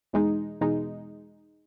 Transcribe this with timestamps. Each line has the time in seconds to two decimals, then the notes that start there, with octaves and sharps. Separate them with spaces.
0.13 E2 B2 G#3 D#4
0.61 E2 B2 G#3 D#4